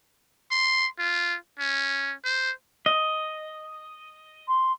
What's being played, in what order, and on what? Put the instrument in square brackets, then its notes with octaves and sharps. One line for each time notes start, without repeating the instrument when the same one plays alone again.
[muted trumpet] C6
F4
C#4
C5
[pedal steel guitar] D#5
[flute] C6